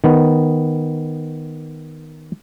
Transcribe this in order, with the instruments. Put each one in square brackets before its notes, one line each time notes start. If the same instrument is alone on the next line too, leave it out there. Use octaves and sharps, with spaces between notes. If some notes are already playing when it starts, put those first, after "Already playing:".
[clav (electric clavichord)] D#3 B3